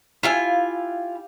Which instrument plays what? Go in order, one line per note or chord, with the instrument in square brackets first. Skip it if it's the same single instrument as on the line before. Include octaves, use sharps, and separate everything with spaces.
[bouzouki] E4 F4 G#5 [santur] G4 F5